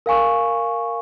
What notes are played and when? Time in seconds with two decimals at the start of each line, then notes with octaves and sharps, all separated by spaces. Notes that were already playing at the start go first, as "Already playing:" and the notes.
0.06 A#4 F5 G#5 C#6